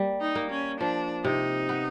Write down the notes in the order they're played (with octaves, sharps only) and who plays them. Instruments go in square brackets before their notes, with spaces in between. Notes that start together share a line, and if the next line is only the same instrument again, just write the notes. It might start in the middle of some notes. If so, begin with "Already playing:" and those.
Already playing: [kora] G3 A#3
[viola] D#4
[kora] A#3
[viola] C#4
[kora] F3 [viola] D4
[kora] C3 [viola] D#4
[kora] B3